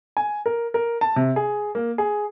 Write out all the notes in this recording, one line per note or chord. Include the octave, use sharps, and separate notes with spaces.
G#5
A#4
A#4
A5
C3
G#4
A#3
G#4